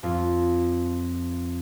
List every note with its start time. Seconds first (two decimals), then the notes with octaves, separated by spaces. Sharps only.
0.03 F2 F4